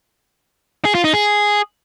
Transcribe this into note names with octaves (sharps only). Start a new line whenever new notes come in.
G#4
F4
D#4
G#4